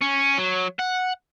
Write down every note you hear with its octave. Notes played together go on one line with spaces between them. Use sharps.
C#4
F#3
F#5